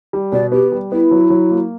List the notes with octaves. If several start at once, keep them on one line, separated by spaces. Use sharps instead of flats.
G3
B2 D5
B3 G4
G3
B3 E4
F#3
F#3
A#3